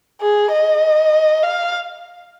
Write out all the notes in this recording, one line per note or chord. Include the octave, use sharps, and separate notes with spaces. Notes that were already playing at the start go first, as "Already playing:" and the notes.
G#4
D#5
F5